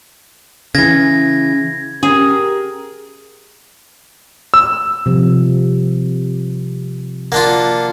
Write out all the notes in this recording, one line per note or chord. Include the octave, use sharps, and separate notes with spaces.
C#3 E3 G#6 A#6
C#4 G4 G#4 A#4
E6
C3 F3
A#3 D4 F4 F#5